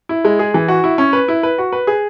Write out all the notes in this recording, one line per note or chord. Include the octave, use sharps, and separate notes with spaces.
E4
G#3
G#4
E3
F#4
E4
C#4
B4
E4
B4
F#4
B4
G#4